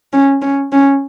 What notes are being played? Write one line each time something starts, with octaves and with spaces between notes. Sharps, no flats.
C#4
C#4
C#4